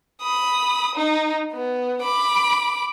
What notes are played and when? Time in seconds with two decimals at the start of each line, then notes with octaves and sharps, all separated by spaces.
0.22 B5 D#6
0.95 D#4
1.52 B3
2.02 B5 D6